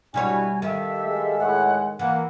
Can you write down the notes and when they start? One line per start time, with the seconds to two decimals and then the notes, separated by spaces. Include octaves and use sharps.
0.14 B2 G3 D4 E4 F#4 C#5 G#5
0.62 D#3 G4 A4 E5 F5
1.06 G#3
1.39 A2 F#5
1.99 E3 A#3 F#5